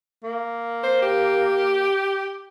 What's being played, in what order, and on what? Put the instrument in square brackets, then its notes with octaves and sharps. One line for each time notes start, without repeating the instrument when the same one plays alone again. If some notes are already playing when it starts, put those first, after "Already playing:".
[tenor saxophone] A#3
[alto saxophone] C5
G4